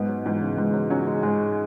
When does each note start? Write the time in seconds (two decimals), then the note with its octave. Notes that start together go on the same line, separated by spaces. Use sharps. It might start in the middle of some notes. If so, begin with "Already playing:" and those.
Already playing: G#2 B3
0.09 F#3
0.26 G#2 E3
0.42 C#3
0.58 G#2 G#3
0.74 F#3
0.90 F#3 C#4
1.07 G#3
1.23 G#2 G#3